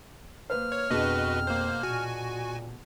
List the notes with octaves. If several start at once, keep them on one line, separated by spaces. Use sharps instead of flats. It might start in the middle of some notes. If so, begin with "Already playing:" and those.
A#3 B4 C5 F6
C#5
F2 B2 D4 F#4 G#4 B4 D#5
A#3 C5
A#2 F#4 G#5